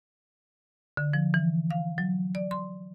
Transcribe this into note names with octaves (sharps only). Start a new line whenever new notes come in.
D3
F3
E3
F5
F#3
D5
C6